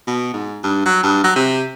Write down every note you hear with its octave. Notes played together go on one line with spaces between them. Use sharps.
B2
G#2
G2
F#3
G2
F#3
C3